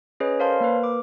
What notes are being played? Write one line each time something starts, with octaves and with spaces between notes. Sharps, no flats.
C#4 G#4 B4 C#5 D#5
A#4 C5 C#5 F5 A5 C6
A#3 A#4 B4
D6